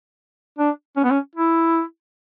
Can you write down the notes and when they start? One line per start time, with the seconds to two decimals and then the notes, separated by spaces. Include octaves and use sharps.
0.59 D4
0.97 C#4
1.04 B3
1.11 C#4
1.36 E4